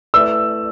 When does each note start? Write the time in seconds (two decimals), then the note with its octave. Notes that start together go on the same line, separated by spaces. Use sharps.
0.14 A3 E4 B4 D5 E6